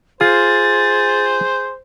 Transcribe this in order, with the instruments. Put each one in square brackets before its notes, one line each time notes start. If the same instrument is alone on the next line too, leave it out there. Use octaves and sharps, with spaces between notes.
[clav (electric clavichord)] F4 [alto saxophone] G#4 [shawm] C5 [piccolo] A6